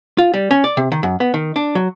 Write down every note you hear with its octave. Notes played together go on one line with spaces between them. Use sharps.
F4
G3
C#4
D5
C3
D#3
F#2
B3
D#3
D4
F#3